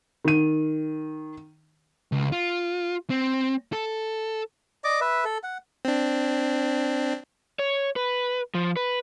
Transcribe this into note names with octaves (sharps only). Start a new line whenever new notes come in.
D#3 D#7
C#2
F4
C4
A4
D5 D#5 D6
B4 E5
A4
F#5
C4 D4
C#5
B4
F3
B4